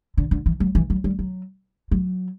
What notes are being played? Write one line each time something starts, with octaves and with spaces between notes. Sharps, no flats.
D3
D3
E3
F#3
E3
F#3
G3
F#3
F#3